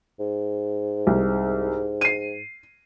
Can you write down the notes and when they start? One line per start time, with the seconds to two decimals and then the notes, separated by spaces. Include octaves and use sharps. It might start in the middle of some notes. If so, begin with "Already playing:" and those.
0.20 G#2
1.07 C2
2.01 C7 D#7